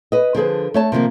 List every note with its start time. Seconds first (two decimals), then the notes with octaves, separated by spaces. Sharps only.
0.12 B4 D#5
0.35 D3 F3 G#4 B4
0.74 A3 C#5 A5
0.92 C3 D#3 F3 A#3